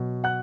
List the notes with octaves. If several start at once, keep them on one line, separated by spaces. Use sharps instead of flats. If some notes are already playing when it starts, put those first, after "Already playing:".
Already playing: B2 F#3
F#5 F#6